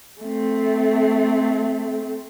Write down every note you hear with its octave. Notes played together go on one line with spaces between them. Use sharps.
A3 C4